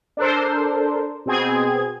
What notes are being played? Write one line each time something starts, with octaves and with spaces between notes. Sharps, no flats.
D4 A4 A#4 C5
B2 C4 G#4 G#6